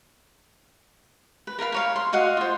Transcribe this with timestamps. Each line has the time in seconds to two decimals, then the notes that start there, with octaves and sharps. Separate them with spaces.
1.47 B4
1.59 A#4 B4 F5 B5
1.72 A#4 C#5 F5
1.96 C6
2.13 F#4 D#5 F5 F#5
2.37 F4 C5